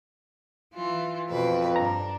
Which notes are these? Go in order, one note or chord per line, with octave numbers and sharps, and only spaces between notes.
E3 F4
F2 B2 B4
G2 D4 A#5